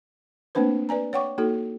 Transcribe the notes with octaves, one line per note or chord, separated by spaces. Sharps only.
A3 A#3 C4 D4 B4 C5
B4 D5 G#5 A#5
C#5 F#5 G5 C#6 D6
A#3 D#4 F#4 A4